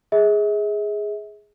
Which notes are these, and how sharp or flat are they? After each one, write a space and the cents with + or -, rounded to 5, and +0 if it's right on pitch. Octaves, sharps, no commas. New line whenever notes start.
G#4 +0 E5 -45